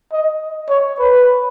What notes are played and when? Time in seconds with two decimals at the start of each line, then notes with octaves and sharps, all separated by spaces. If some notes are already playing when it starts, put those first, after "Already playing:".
0.13 D#5
0.70 C#5
0.99 B4